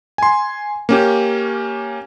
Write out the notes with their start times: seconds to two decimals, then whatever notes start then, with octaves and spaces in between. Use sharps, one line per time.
0.18 G#5 C6
0.89 A#3 C#4 G4